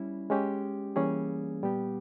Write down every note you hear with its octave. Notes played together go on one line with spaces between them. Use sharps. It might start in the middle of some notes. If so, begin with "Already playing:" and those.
Already playing: G3 C#4 E4
G#3 C#4 G4
E3 G3 A#3 C#4 G#4
A#2 G3 B3 G4